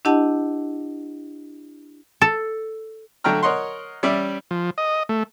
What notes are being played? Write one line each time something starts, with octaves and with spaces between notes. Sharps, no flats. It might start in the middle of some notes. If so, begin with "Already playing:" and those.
D4 E4 G4 D#5 F#5 A5
A4
D3 F#3 A3 G5 A#5 F6
A#4 C#5 D#5 F#5 C6
G3 C#4 D5 E5
F3
D#5
A3